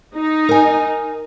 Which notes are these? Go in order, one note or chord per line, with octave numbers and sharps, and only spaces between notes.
D#4
A#4 G#5